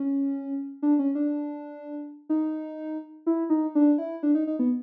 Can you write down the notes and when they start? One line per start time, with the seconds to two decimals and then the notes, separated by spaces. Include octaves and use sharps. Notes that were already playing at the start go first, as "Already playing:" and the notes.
Already playing: C#4
0.82 D4
0.99 C#4
1.15 D4
2.29 D#4
3.27 E4
3.50 D#4
3.75 D4
3.98 E4
4.23 D4
4.35 D#4
4.47 D#4
4.59 B3